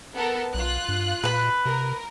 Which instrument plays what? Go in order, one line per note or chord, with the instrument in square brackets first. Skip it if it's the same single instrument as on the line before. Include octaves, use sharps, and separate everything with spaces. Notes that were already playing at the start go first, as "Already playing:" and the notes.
[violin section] B3 A4 A#4
[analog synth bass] B1 [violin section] F4 F#6
[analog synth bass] G2
[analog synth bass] A#2 [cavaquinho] B4 B5
[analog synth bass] C3 [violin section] A#4